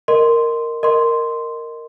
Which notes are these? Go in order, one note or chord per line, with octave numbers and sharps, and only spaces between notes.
A#4 D#5 C6
A#4 D#5 C6